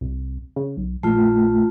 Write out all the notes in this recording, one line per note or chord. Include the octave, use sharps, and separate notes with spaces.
C2
C#3
B1
A#1 A3 F4